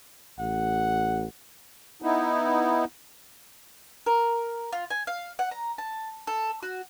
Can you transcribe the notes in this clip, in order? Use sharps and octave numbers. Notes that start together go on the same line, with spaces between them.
A1 F#5
B3 D#4 E4
A#4
F4
G#5
F5
F#5
A#5
A5
A4
F#4